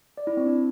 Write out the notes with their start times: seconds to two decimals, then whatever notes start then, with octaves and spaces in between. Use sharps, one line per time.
0.17 D5
0.27 E4
0.37 C4
0.46 D4